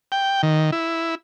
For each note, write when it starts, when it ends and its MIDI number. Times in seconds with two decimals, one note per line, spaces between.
0.12 0.42 79
0.43 0.71 51
0.72 1.15 64